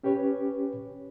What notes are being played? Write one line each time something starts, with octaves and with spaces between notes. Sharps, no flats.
C#4 G4 B4 C#5